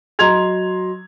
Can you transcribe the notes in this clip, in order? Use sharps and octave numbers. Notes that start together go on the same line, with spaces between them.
F#3 D#5 A#5 C6 G#6 F7